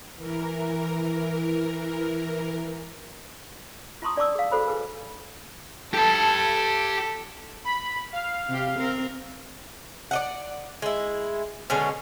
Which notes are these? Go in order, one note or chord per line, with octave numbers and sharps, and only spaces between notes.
E3 A#4
F4 A5 A#5 C6 C#6 D#6
D4 D5 A5 C#6 D6 E6
G#4 F5
F#4 A4 C5 B5
G#4 B4 G#5
G4 A4 A5
B5
F5
C3 G4
C4 A#4
D5 D#5 F#5
G#3 E4
B2 D3 G#3 C#4